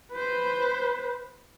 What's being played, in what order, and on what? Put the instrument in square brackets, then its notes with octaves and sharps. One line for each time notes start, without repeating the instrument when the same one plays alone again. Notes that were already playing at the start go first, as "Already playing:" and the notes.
[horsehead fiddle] B4 C5